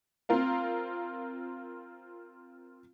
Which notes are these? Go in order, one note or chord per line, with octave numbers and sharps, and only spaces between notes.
C4 F4 A#4 F5